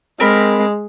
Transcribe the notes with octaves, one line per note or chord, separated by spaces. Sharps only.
G#3 C4 A#4 B5